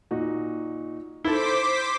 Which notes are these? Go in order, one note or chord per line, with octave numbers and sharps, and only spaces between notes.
A#2 D#4 F#4
E4 A4 C5 D6 B6 G7